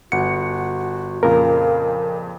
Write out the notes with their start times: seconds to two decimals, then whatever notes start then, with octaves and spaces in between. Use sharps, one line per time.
0.12 G1 F#4 F#5 C#7
1.23 F2 A#2 C#3 A#4 F5